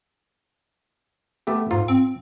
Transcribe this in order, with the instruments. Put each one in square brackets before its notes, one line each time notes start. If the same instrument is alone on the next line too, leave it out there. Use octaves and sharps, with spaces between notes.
[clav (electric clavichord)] A3 B3 G4
[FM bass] G#2 [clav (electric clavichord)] F4
[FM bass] C4